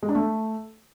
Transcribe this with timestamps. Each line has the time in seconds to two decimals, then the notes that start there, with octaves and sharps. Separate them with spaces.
0.03 G#3
0.09 D4
0.15 A3